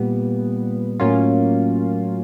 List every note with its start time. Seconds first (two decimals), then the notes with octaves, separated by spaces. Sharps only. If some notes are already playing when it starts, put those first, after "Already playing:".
Already playing: A#2 G3 B3
1.00 A2 F#3 A#3 C#4 F4